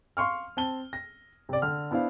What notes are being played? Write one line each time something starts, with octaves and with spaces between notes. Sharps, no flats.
F5 C6 C#6 F6
C4 A5 G7
A#6
C3 D5
D3 F6
B3 D4 E4 C5 F5